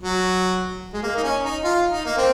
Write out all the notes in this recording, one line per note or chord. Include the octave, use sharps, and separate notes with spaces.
F#3
G#3
A#3
D#4
C#4
D#4
F4
D#4
A#3
C4